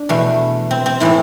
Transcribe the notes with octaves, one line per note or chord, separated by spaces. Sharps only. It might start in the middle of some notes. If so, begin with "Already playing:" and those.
Already playing: D4
E2 B2 A3
C4
C4
A2 E3 A3 E4